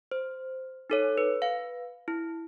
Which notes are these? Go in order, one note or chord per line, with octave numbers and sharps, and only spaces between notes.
C5
D#4 A4 C#5
B4
B4 F5
E4